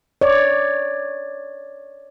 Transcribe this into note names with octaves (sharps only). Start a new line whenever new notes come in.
C#5 D5